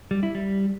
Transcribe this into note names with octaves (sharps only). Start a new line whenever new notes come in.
G3
E4
G3